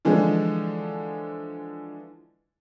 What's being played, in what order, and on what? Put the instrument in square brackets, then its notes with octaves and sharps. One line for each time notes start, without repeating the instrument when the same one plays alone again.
[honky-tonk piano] D3 E3 F3 G#3